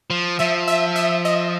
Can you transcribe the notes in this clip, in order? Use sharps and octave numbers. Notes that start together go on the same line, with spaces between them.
F3
F3 E5
E5
E5
D#5